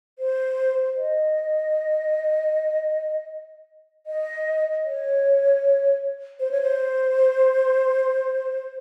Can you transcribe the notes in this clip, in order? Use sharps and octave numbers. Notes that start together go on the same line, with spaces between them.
C5
D#5
D#5
C#5
C5
C#5
C5